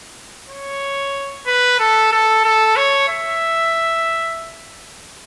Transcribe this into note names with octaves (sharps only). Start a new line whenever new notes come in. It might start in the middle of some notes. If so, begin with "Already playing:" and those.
C#5
B4
A4
A4
A4
C#5
E5